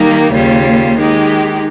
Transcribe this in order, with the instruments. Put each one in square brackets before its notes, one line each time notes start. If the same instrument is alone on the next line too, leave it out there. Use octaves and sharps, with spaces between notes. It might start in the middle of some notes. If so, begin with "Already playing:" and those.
Already playing: [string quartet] D#3 G3 A#3 D#4 G4
D#2 C#3 G3 A#3 F4
D#3 G#3 D#4 G4